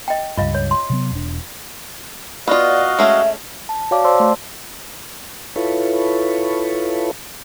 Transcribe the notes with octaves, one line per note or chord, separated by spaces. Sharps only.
D#5 G5
C#2 G2 F4 D#5 F5
C#5
C6
C3 F#3 B3
E1 D4
B3 F4 F#4 D5 D#5 F5
G#3 A3 C#4 E5
A5
F#4 C#5 D5 F5 A5 D6
C5 D5 A5 C6 E6
A3 C6
E4 F4 A4 B4 C#5